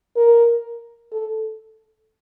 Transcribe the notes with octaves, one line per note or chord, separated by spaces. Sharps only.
A#4
A4